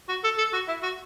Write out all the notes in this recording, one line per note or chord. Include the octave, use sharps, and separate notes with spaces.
F#4
A4
A4
F#4
E4
F#4